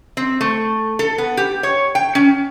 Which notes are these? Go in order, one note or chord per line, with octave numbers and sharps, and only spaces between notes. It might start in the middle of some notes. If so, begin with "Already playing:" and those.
C4
A3
A4
B3
G4
C#5
G5
C#4